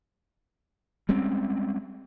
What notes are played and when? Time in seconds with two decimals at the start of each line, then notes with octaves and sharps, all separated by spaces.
1.09 G3 G#3 C4 C#4